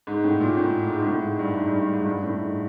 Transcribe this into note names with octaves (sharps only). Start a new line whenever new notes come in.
G#2
A2
A#2
A2
G#2
G#2
A2
G#2
G2
G#2
G2
G2
G#2
G2
A2
G#2